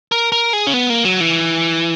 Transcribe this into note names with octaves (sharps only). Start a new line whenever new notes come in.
A#4
A#4
G#4
C#4
B3
A#3
F#3
E3